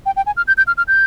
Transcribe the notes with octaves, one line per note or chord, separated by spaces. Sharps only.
G5
G5
G#5
F6
G6
G6
F6
F6
G6